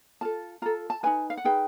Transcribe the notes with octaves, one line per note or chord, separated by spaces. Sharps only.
F4 A4 A5
F4 A4 A#5
A5
D#4 G#4 B4 G#5
F5
F#5
D#4 G#4 B4 G5